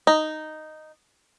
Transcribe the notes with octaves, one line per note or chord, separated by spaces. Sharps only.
D#4